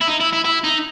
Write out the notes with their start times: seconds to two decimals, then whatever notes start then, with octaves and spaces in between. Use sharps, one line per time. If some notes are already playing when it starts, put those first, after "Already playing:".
0.01 E4
0.08 D#4
0.21 E4
0.33 E4
0.45 E4
0.64 D#4